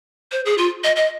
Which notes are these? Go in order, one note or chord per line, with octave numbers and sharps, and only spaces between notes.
C5
G#4
F4
D#5
D#5